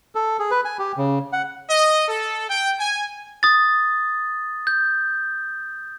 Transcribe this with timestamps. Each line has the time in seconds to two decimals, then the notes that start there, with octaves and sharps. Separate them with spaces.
0.15 A4
0.39 G#4
0.51 B4
0.65 G#5
0.79 G4
0.97 C#3
1.33 F#5
1.69 D#5
2.08 A4
2.48 G5
2.79 G#5
3.43 D#6 A6
4.67 G6